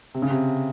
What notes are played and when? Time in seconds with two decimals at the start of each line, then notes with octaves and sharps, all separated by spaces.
0.14 C3
0.22 C#3
0.31 C3